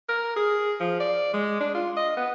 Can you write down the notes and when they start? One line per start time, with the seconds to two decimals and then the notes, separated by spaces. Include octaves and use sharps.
0.09 A#4
0.36 G#4
0.80 F3
1.00 D5
1.33 G#3
1.60 D4
1.74 F4
1.96 D#5
2.17 B3